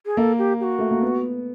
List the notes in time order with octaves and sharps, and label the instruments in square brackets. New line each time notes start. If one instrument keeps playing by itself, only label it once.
[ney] G#4
[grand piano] A#3 [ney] A4
[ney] G4
G4
F#4
[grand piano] A3
A#3
B3